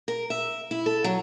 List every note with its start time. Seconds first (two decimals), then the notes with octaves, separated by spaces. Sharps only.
0.08 A#4
0.30 E5
0.71 E4
0.86 A4
1.04 F#3